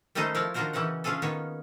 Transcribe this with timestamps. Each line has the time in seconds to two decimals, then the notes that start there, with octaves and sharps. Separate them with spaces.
0.15 D#3 G3 A3 C#4 D#4 C5
0.35 F3 E4 A#4 C#5 D5
0.54 D#3 D4 F4 F#4 A#4 C5
0.73 C#3 E3 C#4 D#4 F#5
1.04 C#4 D4 F4 G#4 A4
1.22 D#3 A#3 B3 C#5